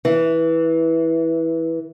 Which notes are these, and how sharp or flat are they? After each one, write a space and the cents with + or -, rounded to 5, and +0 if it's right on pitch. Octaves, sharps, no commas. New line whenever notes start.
E3 -15